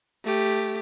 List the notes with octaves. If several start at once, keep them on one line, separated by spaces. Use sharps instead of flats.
A3 G4